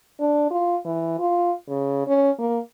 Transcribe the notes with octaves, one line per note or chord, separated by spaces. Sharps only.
D4
F4
E3
F4
C#3
C#4
A#3